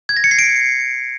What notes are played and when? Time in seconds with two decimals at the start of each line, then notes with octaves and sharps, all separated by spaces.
0.09 G#6
0.17 A#6
0.24 C#7
0.31 C7
0.39 D7